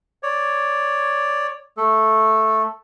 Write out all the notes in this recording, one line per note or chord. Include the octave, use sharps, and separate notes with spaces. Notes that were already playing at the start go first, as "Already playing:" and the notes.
C#5 D5
A3 A4